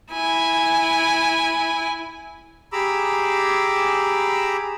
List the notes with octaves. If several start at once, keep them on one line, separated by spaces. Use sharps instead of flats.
E4 G#5
G4 G#4 A#5 B5 D6 E6